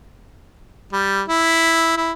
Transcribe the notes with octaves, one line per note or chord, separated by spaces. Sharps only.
G3
E4
E4